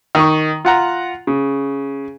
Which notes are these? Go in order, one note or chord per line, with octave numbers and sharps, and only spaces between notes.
D#3 C#6
F4 F#5 A#5
C#3